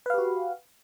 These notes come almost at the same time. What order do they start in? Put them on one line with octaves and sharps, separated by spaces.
B4 F5 G4 F#4